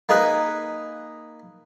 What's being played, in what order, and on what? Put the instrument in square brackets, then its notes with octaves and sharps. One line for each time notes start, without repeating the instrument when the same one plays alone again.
[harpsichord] A#3 D#4 G#4 B4